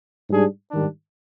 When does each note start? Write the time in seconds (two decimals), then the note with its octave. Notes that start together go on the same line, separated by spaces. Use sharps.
0.30 G#2 G3 D4 G#4
0.71 G#2 D#3 G3 D4